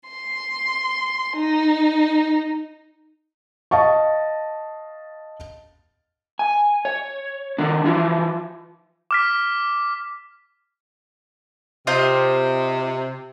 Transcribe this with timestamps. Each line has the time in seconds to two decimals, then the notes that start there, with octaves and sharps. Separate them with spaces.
0.10 C6
1.36 D#4
3.71 D#5 F5 A5 C#6
6.39 G#5
6.85 C#5
7.58 D#3 D4
7.84 E3 F3 E4
9.11 D6 F6 B6
11.87 C3 F4 C5 D#5